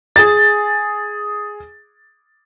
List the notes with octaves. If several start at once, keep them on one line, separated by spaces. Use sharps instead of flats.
G#4 A6